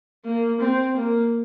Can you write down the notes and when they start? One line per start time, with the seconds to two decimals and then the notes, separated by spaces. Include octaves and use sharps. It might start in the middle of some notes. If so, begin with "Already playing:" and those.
0.25 A#3
0.61 C4
0.97 A#3